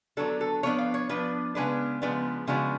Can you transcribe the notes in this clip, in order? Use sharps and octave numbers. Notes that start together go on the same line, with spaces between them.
D3 F#3 B3 D4 A4
A4
F3 B3 D4 C#5
F5
C#5
F3 B3 D4 B4
C#3 F3 G#3 B3 D4 B4
C#3 F3 G#3 B3 D4
C#3 F3 G#3 B3 D4 F#4